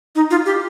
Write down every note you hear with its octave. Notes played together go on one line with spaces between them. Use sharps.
D#4
F4
G4